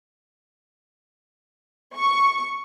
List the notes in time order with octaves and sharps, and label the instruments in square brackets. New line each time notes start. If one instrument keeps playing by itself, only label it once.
[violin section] C#6